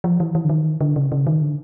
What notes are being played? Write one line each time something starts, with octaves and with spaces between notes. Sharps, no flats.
F3
E3
E3
D3
D#3
D3
C#3
C#3
D#3
D3